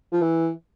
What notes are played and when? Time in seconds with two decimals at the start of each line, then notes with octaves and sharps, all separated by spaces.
0.12 F3
0.21 E3